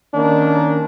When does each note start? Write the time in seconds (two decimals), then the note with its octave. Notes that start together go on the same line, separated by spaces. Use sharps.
0.13 D#3 A#3 C#4 D4